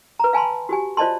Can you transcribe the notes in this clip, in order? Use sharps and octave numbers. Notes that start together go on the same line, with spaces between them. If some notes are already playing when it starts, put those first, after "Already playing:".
B4 A#5
F5 G#5 A5 B5 C6
F#4 G4 G#5
F4 C5 D5 D#5 A5 C6